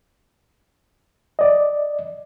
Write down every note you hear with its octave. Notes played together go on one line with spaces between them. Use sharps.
D5 D#5